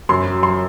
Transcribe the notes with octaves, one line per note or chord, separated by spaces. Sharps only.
F#2 C6
F#3
F#3 C6